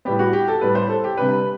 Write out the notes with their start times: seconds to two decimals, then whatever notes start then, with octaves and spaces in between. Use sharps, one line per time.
0.05 A2 G3 B3 G4
0.19 F#4
0.33 G4
0.48 A4
0.61 A2 G3 B3 B4
0.75 C5
0.89 A4
1.04 G4
1.17 C3 G3 D4 B4